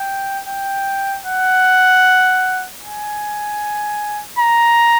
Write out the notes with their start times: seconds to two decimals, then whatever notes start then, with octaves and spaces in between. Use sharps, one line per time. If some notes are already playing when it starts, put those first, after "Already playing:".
Already playing: G5
0.48 G5
1.26 F#5
2.83 G#5
4.39 A#5